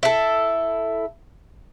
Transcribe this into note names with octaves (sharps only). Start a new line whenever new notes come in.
E4 A4